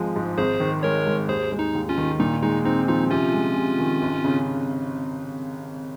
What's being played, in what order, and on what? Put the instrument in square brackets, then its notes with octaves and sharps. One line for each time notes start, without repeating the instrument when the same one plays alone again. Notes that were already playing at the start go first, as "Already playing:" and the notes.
Already playing: [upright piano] G#1 F3 G#3
G#2
[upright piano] G#1 [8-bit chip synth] G#4 C5
[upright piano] D#3
[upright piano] G#3 [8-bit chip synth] A#4 C#5
[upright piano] G#2
[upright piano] D#2 [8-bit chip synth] G#4 C5
[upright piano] G#3
[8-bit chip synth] D#4
[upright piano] D#2
[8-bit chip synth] C#4 F4
[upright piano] D#3
[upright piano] A#2 [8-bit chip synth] D#4
[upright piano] G#3 [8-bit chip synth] D#4
[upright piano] C4 [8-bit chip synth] D#4
[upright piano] F3 [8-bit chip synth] D#4
[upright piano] C3 [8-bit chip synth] C#4 F4
[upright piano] G#3
C3
D#3
G#1
C#3